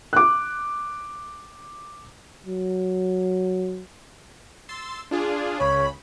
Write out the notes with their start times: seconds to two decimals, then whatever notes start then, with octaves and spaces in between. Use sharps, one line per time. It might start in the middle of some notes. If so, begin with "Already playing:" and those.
0.13 D6 F#6
2.46 F#3
4.69 C6 E6 A6
5.11 D4 F4 G#4
5.60 C#2 C#3 C#5 B5